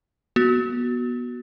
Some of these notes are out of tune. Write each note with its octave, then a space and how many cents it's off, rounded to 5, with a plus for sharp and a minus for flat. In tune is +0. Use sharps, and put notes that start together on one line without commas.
B3 -20 F#4 +0